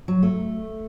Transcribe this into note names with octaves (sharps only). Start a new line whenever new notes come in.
F#3
A3